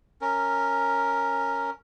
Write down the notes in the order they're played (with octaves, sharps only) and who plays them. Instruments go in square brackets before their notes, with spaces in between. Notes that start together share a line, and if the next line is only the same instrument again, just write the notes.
[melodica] C#4 A#4